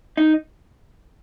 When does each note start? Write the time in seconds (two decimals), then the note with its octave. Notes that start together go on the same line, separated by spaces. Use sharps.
0.17 D#4